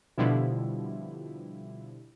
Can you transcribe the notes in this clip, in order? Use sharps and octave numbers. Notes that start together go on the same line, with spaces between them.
B2 D3 F3 G3 E4